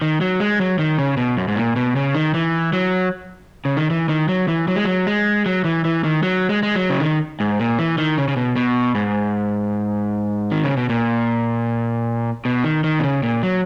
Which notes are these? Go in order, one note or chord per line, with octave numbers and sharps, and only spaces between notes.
D#3
F#3
G#3
F#3
D#3
C#3
B2
F#2
G#2
A#2
B2
C#3
D#3
E3
F#3
C#3
D#3
E3
D#3
F#3
E3
F#3
G#3
F#3
G#3
F#3
E3
E3
D#3
F#3
G#3
G#3
F#3
C#3
D#3
G#2
A#2
E3
D#3
C#3
C#3
B2
B2
G#2
D#3
C#3
B2
A#2
B2
D#3
D#3
B2
C#3
A#2
F#3